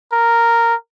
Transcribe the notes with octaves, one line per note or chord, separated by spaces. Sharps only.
A#4